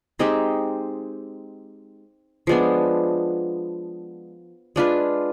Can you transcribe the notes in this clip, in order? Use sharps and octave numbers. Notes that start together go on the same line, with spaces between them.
G#3 C4 D#4 G4
F3 G#3 B3 D4
G#3 D4 F4 B4